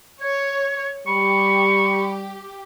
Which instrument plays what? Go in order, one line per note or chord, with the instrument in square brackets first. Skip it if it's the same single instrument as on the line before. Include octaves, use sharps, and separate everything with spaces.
[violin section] C#5 [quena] G#6
[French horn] G3 [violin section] G4 [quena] B5 [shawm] C#6